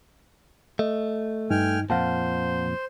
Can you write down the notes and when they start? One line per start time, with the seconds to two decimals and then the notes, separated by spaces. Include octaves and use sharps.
0.79 A3 D#5
1.51 G2 D#4 G5 G#5 F6
1.90 F2 A#2 C5 F5 F#5 A5